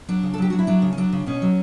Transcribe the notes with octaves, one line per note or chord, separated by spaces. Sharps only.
F#3 D4
C#3
A4
F#3 G4
F#3 F#4
E4
F#3 D4
C#3
C#4
F#3 D4
C#3
B2 C#4
F#3